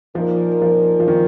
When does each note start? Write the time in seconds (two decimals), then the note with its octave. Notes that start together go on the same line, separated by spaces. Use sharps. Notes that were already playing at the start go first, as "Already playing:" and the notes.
0.14 A#2 F3 A#3 D#4 A#4
0.62 F3
1.00 F3
1.08 D#3